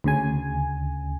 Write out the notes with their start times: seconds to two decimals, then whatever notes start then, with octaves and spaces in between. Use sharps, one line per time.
0.04 D2 C#3 G#5